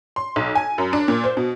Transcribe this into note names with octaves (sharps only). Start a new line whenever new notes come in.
C6
B1
G#5
F#2
D4
A#2
C5
B2